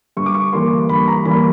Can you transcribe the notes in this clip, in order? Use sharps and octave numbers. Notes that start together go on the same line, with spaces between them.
G2 C#6
D6
C#6
E3 G3 A#3 C6
G2 B5
A#5
E3 G3 A#3 B5